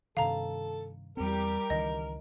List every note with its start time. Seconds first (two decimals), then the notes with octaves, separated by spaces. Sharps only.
0.17 G2 C3 D#3 A4 F5 A#5
1.17 E2 G3 C4 G4 A#4
1.70 C#2 D#3 E3 D#5